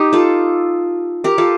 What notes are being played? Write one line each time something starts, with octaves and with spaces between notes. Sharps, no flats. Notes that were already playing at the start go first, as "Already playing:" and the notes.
Already playing: D#4 G4
F4 A4
G4 A#4
F4 A4